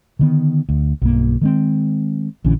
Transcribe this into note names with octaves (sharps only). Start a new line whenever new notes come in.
D3 D#3 B3
D2
B1 G2 A#3
D#3 G#3 C4
A#1 D3 E3 C#4